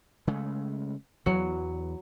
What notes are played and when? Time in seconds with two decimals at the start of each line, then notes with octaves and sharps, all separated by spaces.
0.27 C#3 G#3 A3
1.26 E2 E3 F#3